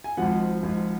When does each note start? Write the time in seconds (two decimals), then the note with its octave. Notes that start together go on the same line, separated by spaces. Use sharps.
0.04 G#5
0.17 G#1 G#2 F3 F#5
0.63 G#1 G#2 F3